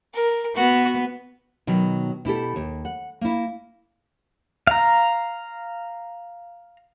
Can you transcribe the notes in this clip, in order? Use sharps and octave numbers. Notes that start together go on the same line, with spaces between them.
A#4
B3 F#4
B2 D#3 F#3
B2 E4 G4 A4
D#2
F#5
A#3 E4
F5 A#5